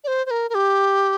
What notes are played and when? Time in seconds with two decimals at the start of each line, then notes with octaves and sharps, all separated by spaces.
0.04 D5
0.08 C5
0.26 C5
0.31 A#4
0.50 A#4
0.55 G4